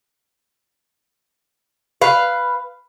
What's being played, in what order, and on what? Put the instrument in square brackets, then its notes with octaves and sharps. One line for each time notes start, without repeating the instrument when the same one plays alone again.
[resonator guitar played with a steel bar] B4 F5